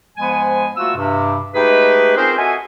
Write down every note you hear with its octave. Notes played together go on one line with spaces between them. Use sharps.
G#2 F3 G#3 B3 G#5
A3 A#3 F4 F#4 E6
G2 C3
G#3 A3 D#4 G4 G#4 B4
C4 C#4 F4 G#4 A#4 C5
F#4 A4 D#5 E5 G#5